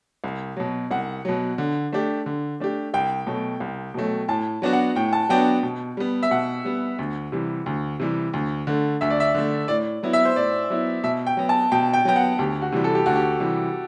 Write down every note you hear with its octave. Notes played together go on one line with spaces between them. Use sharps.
C2
B2 F#3
C2 F#5
B2 F#3
D3
A3 D4 G4
D3
A3 D4 G4
C2 G5
B2 F#3 A3
C2
B2 F#3 A3
A2 A5
F#3 B3 D4 F#4
F#5
A2 G5
A5
F#3 B3 D4 F#4 G5
B2
G3 B3
E5
B2 F#5
G3 B3
D2
C3 E3 G3
D2
C3 E3 G3
D2
D3 A3
D2 E5
D5
E5
D3 A3
A2 D5
F#3 B3 E4
E5
C5
A2 D5
F#3 B3 E4
B2 E5
G5
F#3 B3
A5
B2 G5
G5
F#3 B3 G5
F#5
D2 G4
F#4
C3 E3 G3
A4
G4
D2 F#4
G4
C3 E3 G3